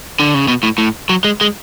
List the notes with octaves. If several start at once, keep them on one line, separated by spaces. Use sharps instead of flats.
D3
C#3
B2
A2
A2
F#3
G#3
G#3